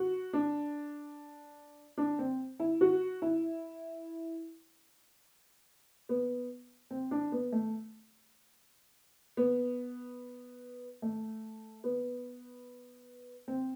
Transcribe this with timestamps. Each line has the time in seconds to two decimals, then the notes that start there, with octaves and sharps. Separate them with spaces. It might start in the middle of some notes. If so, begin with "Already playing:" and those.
Already playing: F#4
0.33 D4
1.98 D4
2.19 C4
2.60 E4
2.81 F#4
3.22 E4
6.09 B3
6.91 C4
7.11 D4
7.32 B3
7.52 A3
9.37 B3
11.02 A3
11.84 B3
13.48 C4